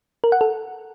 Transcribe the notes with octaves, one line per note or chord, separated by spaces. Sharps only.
A#4
F#5
A4